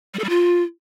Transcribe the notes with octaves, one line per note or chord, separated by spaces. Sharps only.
G3
A4
G3
F4